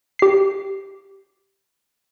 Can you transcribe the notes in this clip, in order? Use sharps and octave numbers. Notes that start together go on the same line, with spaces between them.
G4 C7